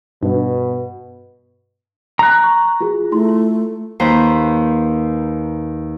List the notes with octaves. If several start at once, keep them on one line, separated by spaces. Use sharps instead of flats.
G2 B2
A#5 F#6
C#6
F4 F#4 G#4
A3 E4 F4 C6
D#2 B4 C5 A#5